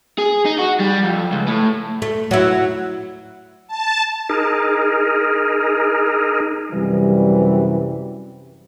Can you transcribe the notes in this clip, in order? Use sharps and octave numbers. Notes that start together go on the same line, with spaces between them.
G#4
D#4
F#4
G3
F2
C#2
A2
A3
F#3 E4
A5
D#4 G#4 A#4
F#2 C3 E3 G3